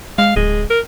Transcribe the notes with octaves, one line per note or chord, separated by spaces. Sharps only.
G#3 F5
D1 G#3
A#4